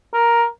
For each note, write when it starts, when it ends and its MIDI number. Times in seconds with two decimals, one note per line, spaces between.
0.14 0.44 70